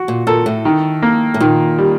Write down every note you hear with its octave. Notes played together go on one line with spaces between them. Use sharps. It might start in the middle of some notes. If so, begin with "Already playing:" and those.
Already playing: F#4
A#2
A#2 A4
A2
D#3
A#3
A2
A#2 D#3
G3